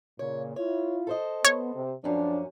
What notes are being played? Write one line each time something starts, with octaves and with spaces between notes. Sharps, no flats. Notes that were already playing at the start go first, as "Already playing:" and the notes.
A#2 C#3 C#5
E4 F4 C#5
A4 C5 D#5
B3 C#5
C3
F#2 F3 C#4 D4